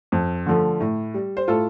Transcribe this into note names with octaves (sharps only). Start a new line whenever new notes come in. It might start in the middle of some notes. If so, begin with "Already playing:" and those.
F2
D3 F3 A3
A2
G3
C5
A2 F4 A4